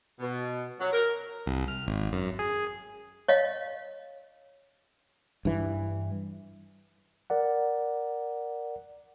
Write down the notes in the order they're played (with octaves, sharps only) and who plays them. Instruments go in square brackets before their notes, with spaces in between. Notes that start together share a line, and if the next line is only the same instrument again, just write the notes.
[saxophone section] B2
F#3
A#4
[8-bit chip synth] C2
F6
G#1
F#2
G#4
[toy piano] C#5 D#5 F5
[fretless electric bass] G2 E3
[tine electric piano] A#4 D5 F#5